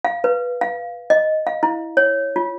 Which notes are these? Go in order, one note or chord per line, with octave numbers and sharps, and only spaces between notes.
F5
B4
F5
D#5
F5
E4
C#5
F4